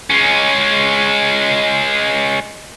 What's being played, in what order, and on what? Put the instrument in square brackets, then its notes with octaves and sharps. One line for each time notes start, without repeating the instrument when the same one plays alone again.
[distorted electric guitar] G#3 C#4